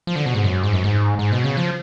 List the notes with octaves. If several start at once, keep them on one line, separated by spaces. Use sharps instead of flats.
F3
D3
B2
G#2
F#2
G#2
F#2
G#2
G#2
B2
C#3
F3